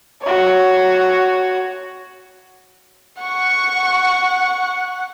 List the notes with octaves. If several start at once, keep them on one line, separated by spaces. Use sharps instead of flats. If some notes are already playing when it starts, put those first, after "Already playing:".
F#4 C#5
F#5 C#6